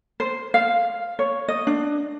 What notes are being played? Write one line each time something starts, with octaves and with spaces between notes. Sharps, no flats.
C5
F5
C#5
D#5
D4